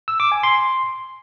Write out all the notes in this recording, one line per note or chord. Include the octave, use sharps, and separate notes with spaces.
E6
D6
G#5
C6